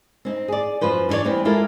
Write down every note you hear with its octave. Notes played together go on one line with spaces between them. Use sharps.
C4 C#4 D#4
G#4 D5
F#2 C3 F3 F4 B4 C5
E3 D4 F4 C#5 D5
E2 G3 C4 B4
G#3 E4 F4 G4 A4 A#4